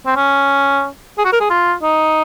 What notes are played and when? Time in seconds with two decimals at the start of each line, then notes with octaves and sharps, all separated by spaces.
0.06 C4
0.16 C#4
1.18 G#4
1.25 F#4
1.33 A#4
1.41 G#4
1.50 F4
1.83 D#4